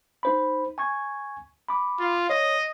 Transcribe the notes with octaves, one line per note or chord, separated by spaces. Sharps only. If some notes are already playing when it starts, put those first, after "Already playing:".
D#4 C5 B5
G#5 C#6 G#6
B5 D6
F4
C#5 D#5